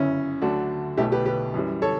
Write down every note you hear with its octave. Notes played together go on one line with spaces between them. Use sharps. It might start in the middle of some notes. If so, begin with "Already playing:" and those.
Already playing: G1 F#2 C#3 C#4 E4
D2 D3 F#3 A3 D4 F#4
B1 B2 A3 E4 G4
G4 B4
G4 B4
F#2 E3 G3
A4 C#5